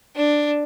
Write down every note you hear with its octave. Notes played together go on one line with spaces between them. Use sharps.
D4